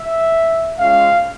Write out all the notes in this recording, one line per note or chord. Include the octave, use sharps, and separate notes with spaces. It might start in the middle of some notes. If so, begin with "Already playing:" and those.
Already playing: E5
G#3 C#4 F4 F5